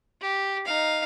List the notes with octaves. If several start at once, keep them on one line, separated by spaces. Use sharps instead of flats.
G4
D#4 F5